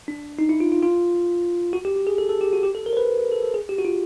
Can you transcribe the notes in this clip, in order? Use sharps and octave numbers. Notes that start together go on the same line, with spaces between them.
D4
D#4
E4
F4
F4
F4
F#4
G4
G4
G#4
A4
A4
G4
F#4
G4
A4
A#4
C5
B4
A4
A4
G#4
G4
F#4
F4